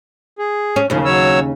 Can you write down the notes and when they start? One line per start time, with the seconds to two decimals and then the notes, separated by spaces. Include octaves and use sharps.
0.39 G#4
0.76 C#4
0.90 D#2 A2 C#3 F3
1.05 F#3 C#5 E6